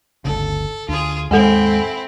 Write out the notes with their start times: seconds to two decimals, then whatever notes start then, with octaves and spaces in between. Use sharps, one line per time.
0.25 G1 D2 C#3 A4
0.89 D2 F4 G#4
1.31 D#2 G#2 G#3 C4 E4 A4 F#5 G#5